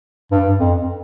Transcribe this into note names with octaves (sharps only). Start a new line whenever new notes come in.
G2
F2